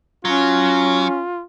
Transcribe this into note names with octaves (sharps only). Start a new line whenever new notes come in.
F#3 C#4 F4